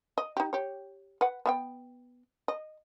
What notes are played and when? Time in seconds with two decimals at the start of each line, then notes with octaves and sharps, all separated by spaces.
0.18 D#5
0.37 D#4 G4
0.53 G4 C#5
1.21 B4 F#5
1.46 B3 E5 G5
2.48 D#5